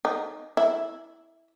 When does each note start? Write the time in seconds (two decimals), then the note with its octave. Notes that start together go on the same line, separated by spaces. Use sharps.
0.05 D#4
0.57 E4